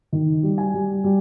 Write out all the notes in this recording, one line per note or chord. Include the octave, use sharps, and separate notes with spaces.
D#3
G3
G#5
G3
G3